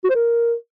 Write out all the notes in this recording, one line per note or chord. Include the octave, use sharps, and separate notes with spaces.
F#4
C5
A#4